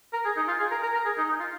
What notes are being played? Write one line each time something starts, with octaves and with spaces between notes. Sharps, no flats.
A#4
G#4
D#4
F4
G#4
A#4
A#4
A#4
G#4
D#4
D#4
F4